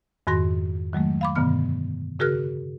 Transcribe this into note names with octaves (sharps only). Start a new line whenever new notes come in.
F2 G#2 D#3 F#4 C6 A#6
D#3 F#3 G#3 A3
F5 B5 D6
G2 B2 D3 D#3 B3 F6
C#3 F#4 G#4 A#4 F6 F#6